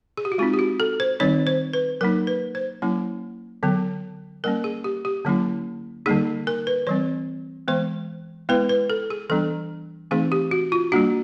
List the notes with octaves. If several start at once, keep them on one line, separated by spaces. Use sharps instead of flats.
G#4
G4
F#4
G#3 C4 D#4 F4
G4
F#4
A4
C5
D#3 G3 C4 D#4 C#5
C5
B4
F#3 A#3 D#4 A#4
B4
C5
F#3 A#3 C#4 E4
D3 F#3 B3
G3 A#3 C#4 A#4
G#4
G4
G4
D3 F#3 A#3 C#4 E4
D3 G3 A#3 D#4 G#4
A#4
B4
E3 G3 C4 C#5
E3 G#3 B3 C5
G#3 B3 E4 B4
B4
A4
G#4
E3 G3 B3 D4 A4
E3 A3 C4 D#4 G#4
G4
F#4
F4
G3 A#3 D4 F#4